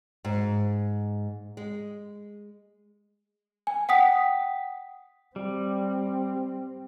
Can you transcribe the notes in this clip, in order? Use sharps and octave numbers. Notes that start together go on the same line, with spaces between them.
G#2
G#3
G#5
F#5 G5 D#6 B6
G3 C4